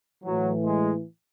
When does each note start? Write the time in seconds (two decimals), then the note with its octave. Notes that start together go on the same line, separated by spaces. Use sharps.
0.24 A2 E3 F#3
0.64 G#3